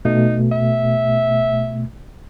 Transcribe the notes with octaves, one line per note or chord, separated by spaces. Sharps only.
B2 A3 D#4
E5